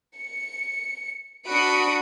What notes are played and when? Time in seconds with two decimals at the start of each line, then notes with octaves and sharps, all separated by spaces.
0.15 C#7
1.47 D4 F#4 B5 D#6 C#7 D7